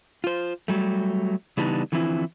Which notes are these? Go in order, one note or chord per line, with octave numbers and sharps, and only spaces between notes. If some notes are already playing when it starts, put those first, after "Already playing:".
F4 C5
F#3 G3 A3
C#3 E3 G3 B3 D4 D#4
D3 E3 F3 C4 E4